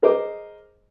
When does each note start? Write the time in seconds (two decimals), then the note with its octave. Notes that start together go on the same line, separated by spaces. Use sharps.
0.02 G#4 A#4 C5 D#5 D6